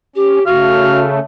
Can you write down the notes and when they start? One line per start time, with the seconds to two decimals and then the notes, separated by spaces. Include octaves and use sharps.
0.15 C#4 G4
0.46 C#3 A3 F#4 F5